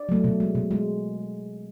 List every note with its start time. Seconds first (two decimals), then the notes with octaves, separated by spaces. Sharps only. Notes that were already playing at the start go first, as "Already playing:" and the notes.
Already playing: D5
0.09 F#3 A3
0.24 B2
0.40 G#3
0.55 B2
0.71 G#3